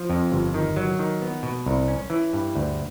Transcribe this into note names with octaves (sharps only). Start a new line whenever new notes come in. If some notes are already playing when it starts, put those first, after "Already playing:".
Already playing: F3
F2
G1
D#3
F#3
D#3
B3
B2
C2
C#4
E3
G2
D2